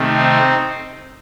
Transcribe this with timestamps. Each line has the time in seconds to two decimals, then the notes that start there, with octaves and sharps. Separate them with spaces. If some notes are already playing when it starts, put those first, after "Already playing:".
Already playing: C3 D#3 A3
0.16 C4 D#4